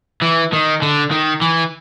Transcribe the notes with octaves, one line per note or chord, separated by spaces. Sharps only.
E3
D#3
D3
D#3
E3